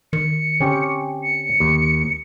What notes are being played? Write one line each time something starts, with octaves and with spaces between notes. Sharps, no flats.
D#3 C#7
D3 C4 C#4 G4
C#7
D#2